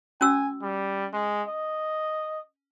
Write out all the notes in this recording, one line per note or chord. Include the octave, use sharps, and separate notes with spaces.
C#4 F#4 G#5 E6
G3
G#3
D#5